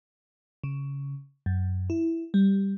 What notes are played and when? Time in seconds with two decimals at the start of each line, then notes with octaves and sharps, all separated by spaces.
0.64 C#3
1.46 F#2
1.90 E4
2.34 G3